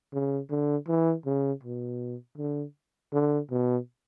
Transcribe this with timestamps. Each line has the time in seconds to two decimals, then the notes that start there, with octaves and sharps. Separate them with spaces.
0.13 C#3
0.50 D3
0.88 E3
1.26 C#3
1.63 B2
2.38 D3
3.13 D3
3.51 B2